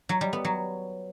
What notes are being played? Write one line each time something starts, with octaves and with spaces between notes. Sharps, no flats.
F#3
G3
B3
F#3